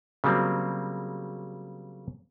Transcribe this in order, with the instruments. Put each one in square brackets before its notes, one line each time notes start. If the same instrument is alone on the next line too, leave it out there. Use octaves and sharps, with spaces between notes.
[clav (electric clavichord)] C#3 F#3 G3 A#3 C4